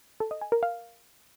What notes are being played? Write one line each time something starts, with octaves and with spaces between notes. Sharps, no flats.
A4
D#5
G#5
A#4
F5